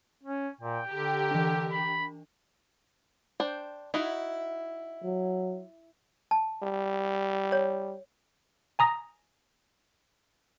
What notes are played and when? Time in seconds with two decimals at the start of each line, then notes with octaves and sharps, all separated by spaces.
0.23 C#4
0.61 A#2 G5
0.90 D3 G4 A#4
1.31 E3 D4
1.72 B5
3.40 D4 C5 G5
3.94 D#4 E4 F#4
5.04 F#3
6.31 A5
6.63 G3
7.52 C#5
8.79 G#5 A#5 D#6 A#6